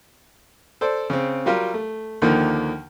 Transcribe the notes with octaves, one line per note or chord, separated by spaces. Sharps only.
A4 C5 D5
C#3 C4
F#3 G3 F4 G4 A#4
A3
D#2 D3 D#3 F3 A#3